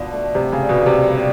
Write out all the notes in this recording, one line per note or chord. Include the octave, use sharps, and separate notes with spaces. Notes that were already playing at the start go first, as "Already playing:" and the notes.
Already playing: B2 D3 F3 D4
A3
C3 G3
C#3
D4
B2
C3 A#3
G3